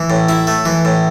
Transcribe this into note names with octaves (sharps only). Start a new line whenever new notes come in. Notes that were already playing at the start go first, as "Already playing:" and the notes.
Already playing: E3
A2
E4
A3
E3
A2